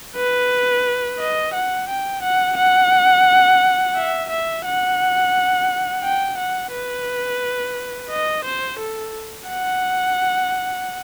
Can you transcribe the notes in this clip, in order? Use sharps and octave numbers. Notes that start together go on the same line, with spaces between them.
B4
D#5
F#5
G5
F#5
F#5
E5
E5
F#5
G5
F#5
B4
D#5
C5
A4
F#5